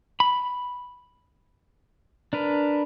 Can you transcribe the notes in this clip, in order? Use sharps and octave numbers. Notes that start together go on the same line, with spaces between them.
B5
D4 A#4 B4